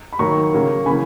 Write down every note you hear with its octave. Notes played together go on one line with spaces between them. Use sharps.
B5
D#3 F#3 A#3 A#5 C#6
C#3 F#3 A#3
C#3 E3 A#3 G#5 B5